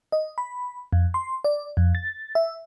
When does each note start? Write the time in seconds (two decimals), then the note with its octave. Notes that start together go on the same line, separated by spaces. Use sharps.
0.12 D#5
0.38 B5
0.93 F2
1.14 C6
1.44 D5
1.77 F2
1.95 A6
2.35 E5